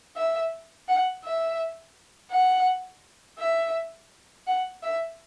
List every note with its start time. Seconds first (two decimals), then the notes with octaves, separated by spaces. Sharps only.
0.16 E5
0.88 F#5
1.24 E5
2.31 F#5
3.39 E5
4.47 F#5
4.83 E5